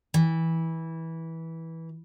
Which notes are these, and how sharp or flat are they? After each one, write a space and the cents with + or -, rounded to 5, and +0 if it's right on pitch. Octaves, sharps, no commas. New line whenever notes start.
E3 -15